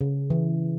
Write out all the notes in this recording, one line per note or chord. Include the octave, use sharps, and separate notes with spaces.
C#3
E3